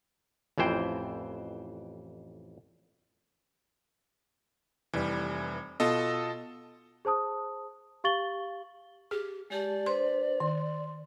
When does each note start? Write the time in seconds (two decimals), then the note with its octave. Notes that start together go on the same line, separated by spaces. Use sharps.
0.58 A1 F2 E3 C5 G5
4.93 F1 E3 G3
5.80 B2 F4 A4 D#5
7.05 G#4 C5 A5 D#6
8.04 G4 F5 C#6 A6 F#7 G7
9.11 G4 G#4
9.50 G#3 G4 D5 A5
9.86 D4 B4 C5 C6
10.40 D#3 C6